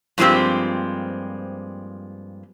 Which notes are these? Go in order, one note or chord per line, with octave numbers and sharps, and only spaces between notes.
G2 F3 G#3 A#3 C4 G4